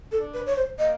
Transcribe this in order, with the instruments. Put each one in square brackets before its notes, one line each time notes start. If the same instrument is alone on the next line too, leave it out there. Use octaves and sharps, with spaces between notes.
[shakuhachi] A4
[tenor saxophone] D4
[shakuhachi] B4
C#5
C5
[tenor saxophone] A#3 [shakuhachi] D#5